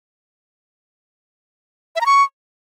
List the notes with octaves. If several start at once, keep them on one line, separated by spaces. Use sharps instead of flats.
E5
A#5
C#6